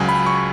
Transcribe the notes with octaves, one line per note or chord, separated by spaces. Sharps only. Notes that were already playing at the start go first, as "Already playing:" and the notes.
Already playing: C#2 C#3 F#3 G#5
B5
C#6